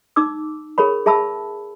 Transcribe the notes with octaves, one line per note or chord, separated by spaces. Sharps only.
D#4 D6 E6
G#4 A#4 C#5 B5
G#4 E5 A5 B5 E6